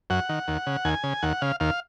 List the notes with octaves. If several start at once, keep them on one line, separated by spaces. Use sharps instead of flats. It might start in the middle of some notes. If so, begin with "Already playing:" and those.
F#2 F#5
D#3
D#2
C#3
D#2 G#5
C#3
D#2 F#5
C#3 F5
D#2 F5